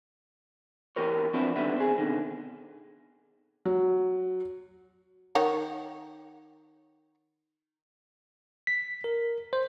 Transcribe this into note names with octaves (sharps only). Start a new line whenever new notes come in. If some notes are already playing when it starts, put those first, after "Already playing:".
E3 G4 A#4 C#5
F3 B3 C4 D4 E4
D3 D#3 G3 B3 E5
C4 G#4
B2 D3 D#3
F#3
D#3 C#5 F#5
B6
A#4
C5